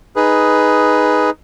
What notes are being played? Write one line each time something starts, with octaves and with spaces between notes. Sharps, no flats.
D#4 G#4 B4